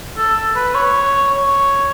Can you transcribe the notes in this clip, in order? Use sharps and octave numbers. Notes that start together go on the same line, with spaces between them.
A4
B4
C#5
C#5